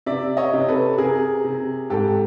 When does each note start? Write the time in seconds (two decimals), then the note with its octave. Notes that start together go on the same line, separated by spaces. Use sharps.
0.06 C3 D5 E5
0.37 C#5 D#5
0.53 C3
0.68 A4 B4
0.98 C3 G#4 A#4
1.44 C3
1.90 G#2 G4 A4